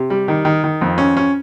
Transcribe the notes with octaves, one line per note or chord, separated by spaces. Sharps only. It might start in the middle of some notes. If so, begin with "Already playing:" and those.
Already playing: C3
G3
D#3
D#3
D#3
F2
C#4
C#4